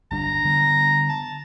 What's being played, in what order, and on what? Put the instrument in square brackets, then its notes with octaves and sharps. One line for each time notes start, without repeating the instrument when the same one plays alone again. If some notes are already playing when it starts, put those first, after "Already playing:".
[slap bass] G1 G3 D4 [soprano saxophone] A#5
[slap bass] D3 G3 B3
[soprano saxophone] A5